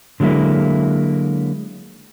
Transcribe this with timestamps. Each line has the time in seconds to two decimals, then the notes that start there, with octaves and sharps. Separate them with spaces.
0.20 D3 F#3 G#3 A#3 E4